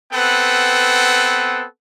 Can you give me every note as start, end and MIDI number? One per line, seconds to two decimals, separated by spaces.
0.13 1.66 59
0.13 1.66 60
0.13 1.66 69
0.13 1.66 71
0.13 1.66 78